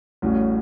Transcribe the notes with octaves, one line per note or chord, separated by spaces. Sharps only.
A1 A2 G3 C#4 F#4